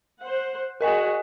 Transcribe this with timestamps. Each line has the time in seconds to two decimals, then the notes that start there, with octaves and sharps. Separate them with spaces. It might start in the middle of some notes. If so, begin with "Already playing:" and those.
0.19 C5 F#5
0.81 F#4 G#4 A#4 D#5 F#5 G#5